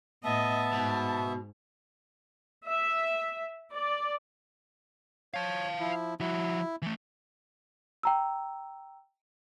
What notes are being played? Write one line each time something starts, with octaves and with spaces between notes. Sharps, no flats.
A2 B3 D#5 E5 A5
G#2 B2
E5
D5
C#5 F5 A5
F3 E4
F3 E4 F#4
E3 A3
G5 A#5 E6